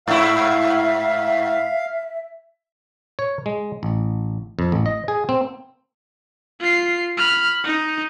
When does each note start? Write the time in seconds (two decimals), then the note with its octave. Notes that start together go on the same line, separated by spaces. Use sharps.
0.08 G#2 E4 E5 F5
3.19 C#5
3.46 G#3
3.83 A1
4.59 F2
4.72 A1
4.86 D#5
5.08 G#4
5.29 C4
6.60 F4 C7
7.17 B5 F6
7.64 D#4